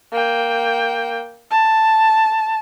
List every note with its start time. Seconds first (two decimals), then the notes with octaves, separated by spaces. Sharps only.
0.13 A#3 G5
1.51 A5